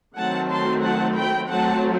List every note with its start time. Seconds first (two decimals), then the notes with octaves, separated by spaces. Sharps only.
0.16 D#3 F#3 A3 C4 F#5 A5
0.50 A5 C6
0.83 F#5 A5
1.16 G5 B5
1.49 F#3 A3 C4 F#5 A5